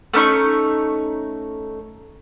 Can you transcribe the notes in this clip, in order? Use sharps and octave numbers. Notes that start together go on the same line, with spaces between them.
A3 C#4 D#4 C#6